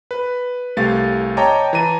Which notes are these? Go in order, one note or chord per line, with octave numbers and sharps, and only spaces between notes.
B4
C2 A3 G4 F5 A6
C#5 D#5 G5 A5 A#5 D6
E3 A5 A#5 D#7